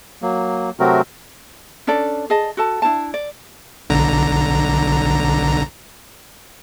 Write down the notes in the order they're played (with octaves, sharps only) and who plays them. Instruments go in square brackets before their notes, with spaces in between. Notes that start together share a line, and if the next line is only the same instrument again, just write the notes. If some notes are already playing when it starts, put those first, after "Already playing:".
[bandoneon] F#3 A#3
C3 F#3 A3 C4 F#4 A#4
[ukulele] C#4 D4 A4 D5
G#4 D5 D#5 A5
F#4 A4 A5
D4 E4 C5 A5
D5
[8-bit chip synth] B1 D3 A#5